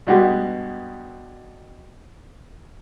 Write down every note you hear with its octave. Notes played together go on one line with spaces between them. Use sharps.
G2 B2 G#3 G4